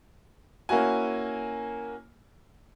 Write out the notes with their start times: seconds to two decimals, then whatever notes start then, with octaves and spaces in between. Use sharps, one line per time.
0.69 A#3 C#4 E4 F#4 G#5